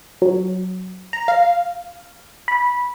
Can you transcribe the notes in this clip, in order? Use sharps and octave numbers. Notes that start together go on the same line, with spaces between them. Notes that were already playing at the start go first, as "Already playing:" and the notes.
F#3
A#5
F5
B5